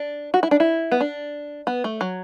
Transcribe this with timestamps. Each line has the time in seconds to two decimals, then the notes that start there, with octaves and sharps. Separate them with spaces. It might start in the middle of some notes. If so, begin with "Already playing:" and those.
Already playing: D4
0.34 F#4
0.43 E4
0.51 D4
0.60 E4
0.92 B3
1.01 D4
1.67 B3
1.84 A3
2.01 F#3